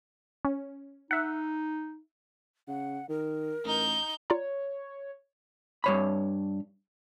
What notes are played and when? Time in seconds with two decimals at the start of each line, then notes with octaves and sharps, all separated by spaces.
0.45 C#4
1.11 D#4 E5 F#5
2.68 C#3 F#5
3.09 D#3 A#4
3.65 A1 D#4 G6
4.30 F4 C#5 D5 A#5
5.84 G2 C#5 B5